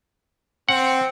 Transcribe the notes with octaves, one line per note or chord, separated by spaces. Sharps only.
C4 F#5